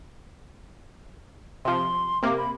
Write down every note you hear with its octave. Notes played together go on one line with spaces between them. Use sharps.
C3 F3 C6
C3 A#3 D6
B5